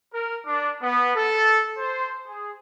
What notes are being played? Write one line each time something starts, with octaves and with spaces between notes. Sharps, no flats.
A#4
D4
B3
A4
C5
G#4